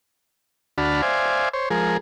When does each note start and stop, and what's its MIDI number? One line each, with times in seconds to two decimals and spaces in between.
0.78 1.02 38
0.78 1.02 62
0.78 1.02 66
0.78 1.02 81
0.78 1.02 83
0.78 1.02 89
1.02 1.49 72
1.02 1.49 74
1.02 1.49 76
1.02 1.49 77
1.02 1.49 80
1.53 1.69 72
1.53 1.69 73
1.71 1.97 53
1.71 1.97 56
1.71 1.97 68
1.71 1.97 70